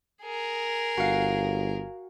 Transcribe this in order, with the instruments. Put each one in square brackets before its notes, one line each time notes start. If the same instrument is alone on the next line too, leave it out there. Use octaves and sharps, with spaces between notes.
[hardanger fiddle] G#4 A#4
[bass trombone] G1 [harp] F#4 F5